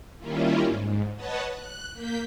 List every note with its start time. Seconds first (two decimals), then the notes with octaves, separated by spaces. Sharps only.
0.18 D#3 G3 A#3 C#4 E4 F4
0.66 G#2
1.16 B4 C#5 D#5 F#5 A5
1.50 F#6
1.94 A#3 G6 B6